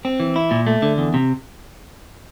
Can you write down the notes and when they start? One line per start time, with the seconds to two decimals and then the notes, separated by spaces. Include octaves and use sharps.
0.05 C4
0.20 E3
0.36 E4
0.51 A#2
0.67 A3
0.82 D3
0.98 E2
1.14 C3